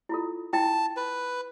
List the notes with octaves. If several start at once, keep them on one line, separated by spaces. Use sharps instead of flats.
E4 F4 A4
E4 G5 A5
B4